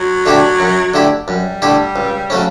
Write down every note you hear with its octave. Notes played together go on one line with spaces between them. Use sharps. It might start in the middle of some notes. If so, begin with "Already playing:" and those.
Already playing: F#3
D3 A3 E4 G4
F#2
D3 A3 E4 G4
F#2 G3
D3 A3 E4 G4
C#2
C#3 F#3 A3 C#4